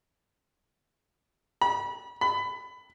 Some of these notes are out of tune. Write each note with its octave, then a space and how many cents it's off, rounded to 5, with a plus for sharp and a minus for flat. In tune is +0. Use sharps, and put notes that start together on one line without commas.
B5 -35
B5 +20